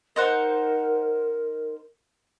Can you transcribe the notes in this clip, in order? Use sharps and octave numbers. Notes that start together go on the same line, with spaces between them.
D#4 A#4 C5 F#5